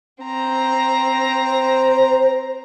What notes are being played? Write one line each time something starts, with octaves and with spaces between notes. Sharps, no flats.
C4 A#5
C5